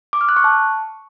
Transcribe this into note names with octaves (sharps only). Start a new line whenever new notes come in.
D6
F6
F#6
C#6
A5